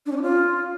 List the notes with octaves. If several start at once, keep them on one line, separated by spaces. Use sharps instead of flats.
D4
C#4
D4
F4